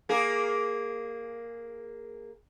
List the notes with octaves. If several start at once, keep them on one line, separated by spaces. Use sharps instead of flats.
A#3 G#4